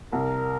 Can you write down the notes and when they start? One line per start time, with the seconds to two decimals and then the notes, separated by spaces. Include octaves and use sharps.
0.12 C2 A#4